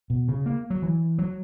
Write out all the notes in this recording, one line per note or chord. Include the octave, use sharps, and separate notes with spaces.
B2
C#3
A#3
F#3
E3
F#3